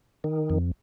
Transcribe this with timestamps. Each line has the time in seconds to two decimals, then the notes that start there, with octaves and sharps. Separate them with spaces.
0.24 D#3
0.50 F2